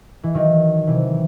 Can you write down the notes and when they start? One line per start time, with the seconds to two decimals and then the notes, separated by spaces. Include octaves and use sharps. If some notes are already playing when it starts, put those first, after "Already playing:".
0.24 E3
0.35 D#3 F#3
0.87 C3 E3